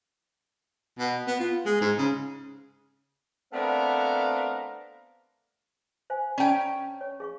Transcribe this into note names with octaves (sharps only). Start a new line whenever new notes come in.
B2
B3
F4
G#3
G#2
C#3
A3 B3 C4 D4 A#4 F5
C5 F5 G#5
C#4 D5 G5 A5 A#5
C#5
G#4 F5 C#6